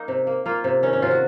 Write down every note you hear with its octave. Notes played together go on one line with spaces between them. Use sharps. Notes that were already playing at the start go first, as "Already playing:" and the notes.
Already playing: A#3 D#4
C3
A#3
A#3 F4
C3
D#3 C#4
C#4
C3 F4
F#4